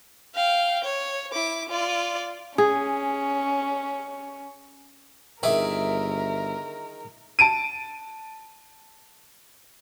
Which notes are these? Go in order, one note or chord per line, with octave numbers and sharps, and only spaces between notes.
F5 G5
C#5
E4 D6
F4 D5
C#4 G#4
G1 D#3 G#4 A#4 E5 D6
A5 D7 D#7